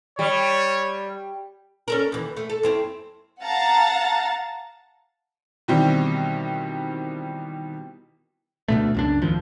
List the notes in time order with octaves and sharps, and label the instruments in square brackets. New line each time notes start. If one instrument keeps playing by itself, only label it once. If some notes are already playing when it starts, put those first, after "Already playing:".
[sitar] G3 [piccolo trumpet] C#5
[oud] C#4 A4 A#4
D#2 E3
A3
A4
F#2 C4 E4
[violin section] F5 F#5 A5 A#5 A6
[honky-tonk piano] B2 D#3 E3 G3 C4
[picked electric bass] D2 B2 A3
C#2 F#2 D4
G#1 D#2 F3